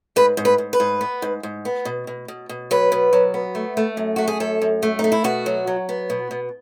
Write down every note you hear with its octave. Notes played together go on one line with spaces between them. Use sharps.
G#2 B4
G#2
B4
G#2
B4
G#2
B3
G#2
G#2
B3
B2
B2
B2
B2
F#3 B4
B2
F#3
B3
A3
A3
F#2
A3 F#4
G#4
F#2 A4
F#2
A3
D#4
A3
E4
B2 F#4
F#3
F#3
B3
B2
B2